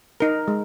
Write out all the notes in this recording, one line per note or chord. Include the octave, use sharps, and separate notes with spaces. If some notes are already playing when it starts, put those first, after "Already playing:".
D#4 A#4
G#3